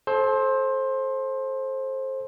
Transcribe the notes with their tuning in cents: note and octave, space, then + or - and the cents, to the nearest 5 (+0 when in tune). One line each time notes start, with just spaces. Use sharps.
A4 -25 C5 +20